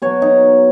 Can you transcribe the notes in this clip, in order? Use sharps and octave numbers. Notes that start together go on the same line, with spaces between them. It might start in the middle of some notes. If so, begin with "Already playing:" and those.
B2 F#3 C#5
D#4